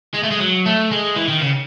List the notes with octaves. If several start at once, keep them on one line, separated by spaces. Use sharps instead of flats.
G#3
A3
G#3
F#3
A3
G#3
E3
D#3
C#3